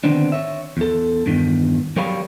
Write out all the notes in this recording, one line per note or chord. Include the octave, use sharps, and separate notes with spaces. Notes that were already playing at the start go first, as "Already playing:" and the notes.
D3 D#3 B3 C4 D4
C#5 E5
E2 A4
E2 G2 D#3 B3
F#3 G3 A#4 C#5 F5 B5